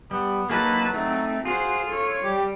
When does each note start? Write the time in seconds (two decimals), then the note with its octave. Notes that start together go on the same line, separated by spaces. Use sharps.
0.11 G3 B3
0.50 F#3 A#3 D#4 B4 A5
0.94 A3 C4 D#4
1.45 F4 F#4 G#4 C5
1.87 A4 C#5
2.23 G3 G4